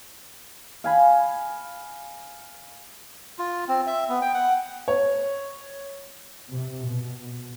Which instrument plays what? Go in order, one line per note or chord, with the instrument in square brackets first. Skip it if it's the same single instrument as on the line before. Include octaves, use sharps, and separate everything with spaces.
[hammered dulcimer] F5 G#5 B5
[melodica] F4
C4
E5
B3
G5
F#5
[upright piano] C#5
[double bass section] C3
B2